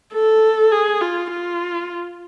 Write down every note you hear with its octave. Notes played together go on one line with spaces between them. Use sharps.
A4
G#4
F4
F4